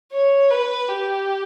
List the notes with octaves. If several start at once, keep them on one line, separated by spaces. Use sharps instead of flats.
C#5
B4
G4